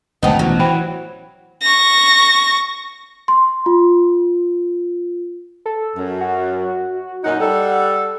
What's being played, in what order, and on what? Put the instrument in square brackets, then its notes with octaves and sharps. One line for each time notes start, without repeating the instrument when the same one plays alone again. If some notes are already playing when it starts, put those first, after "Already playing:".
[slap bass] G#1 D2 F#3 [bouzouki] B3 D#4 [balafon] C5 G5 A5
[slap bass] A1 B2 [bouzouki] F#3
[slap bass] E3 [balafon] C5 G5 B5
[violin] C#6 A#6
[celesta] C6
F4
[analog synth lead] A4
[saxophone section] F#2
[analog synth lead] F#4
[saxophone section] F#2 A#2 D#4 [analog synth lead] F#5
[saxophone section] G3 A4